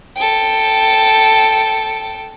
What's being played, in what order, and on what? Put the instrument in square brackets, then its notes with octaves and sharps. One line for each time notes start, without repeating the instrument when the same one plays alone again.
[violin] A4 G5